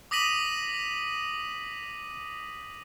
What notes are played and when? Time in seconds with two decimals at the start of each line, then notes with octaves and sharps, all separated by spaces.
0.11 D6 D#6 A#6 B6 D#7 F#7